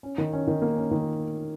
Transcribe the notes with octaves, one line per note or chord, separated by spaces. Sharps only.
C#4
D#3
C#4
D#3
A#3
C#4
D#3